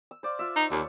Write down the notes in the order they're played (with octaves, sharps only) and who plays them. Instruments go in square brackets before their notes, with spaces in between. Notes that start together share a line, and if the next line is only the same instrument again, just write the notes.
[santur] E6
C5 D5 F5
F4 E5
[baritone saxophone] D#4
[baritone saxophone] D#2 [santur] C#5 F5